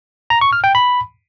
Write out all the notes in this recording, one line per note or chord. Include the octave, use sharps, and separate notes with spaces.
A#5
C#6
F6
G5
B5